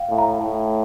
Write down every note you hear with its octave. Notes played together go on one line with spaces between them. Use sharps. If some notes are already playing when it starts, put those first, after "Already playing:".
Already playing: F5 G5
A2
A#5
A2